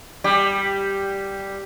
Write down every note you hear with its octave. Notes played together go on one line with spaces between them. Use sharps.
G3 G4